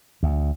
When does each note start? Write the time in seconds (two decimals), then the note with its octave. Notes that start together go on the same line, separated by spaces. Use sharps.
0.23 D2